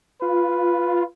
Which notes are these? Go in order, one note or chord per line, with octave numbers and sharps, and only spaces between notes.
F4 B4